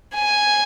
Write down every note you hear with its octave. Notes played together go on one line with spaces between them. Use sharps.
G#5